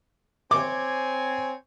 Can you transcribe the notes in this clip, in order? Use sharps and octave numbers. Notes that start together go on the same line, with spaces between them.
C4 C#5 G#5 D6